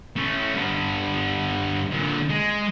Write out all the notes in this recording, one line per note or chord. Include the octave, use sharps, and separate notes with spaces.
A3 C#4
G2 B3
A#2 D3
G#3